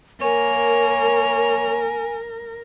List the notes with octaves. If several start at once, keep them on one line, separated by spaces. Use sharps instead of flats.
A#3 A#4 C#5 G#5